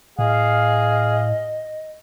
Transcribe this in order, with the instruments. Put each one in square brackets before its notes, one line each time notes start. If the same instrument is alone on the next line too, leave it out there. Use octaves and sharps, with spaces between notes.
[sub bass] A2 [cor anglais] G#4 [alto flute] D#5 [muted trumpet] F5